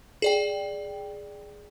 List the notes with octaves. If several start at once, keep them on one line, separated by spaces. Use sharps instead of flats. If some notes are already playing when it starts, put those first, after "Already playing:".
G#4 D5 G5